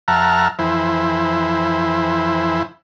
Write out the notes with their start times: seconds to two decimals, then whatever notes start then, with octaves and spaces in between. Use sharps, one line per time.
0.08 F2 E5 F#5 A5 A#5 F6
0.59 F2 E3 E4 C5